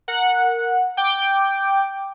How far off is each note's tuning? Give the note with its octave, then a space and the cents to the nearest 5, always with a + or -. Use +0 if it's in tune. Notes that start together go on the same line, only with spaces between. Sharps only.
A#4 -10 F#5 -15
G5 +0 D6 +0